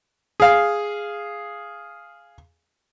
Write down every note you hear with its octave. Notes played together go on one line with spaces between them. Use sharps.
G#4 F5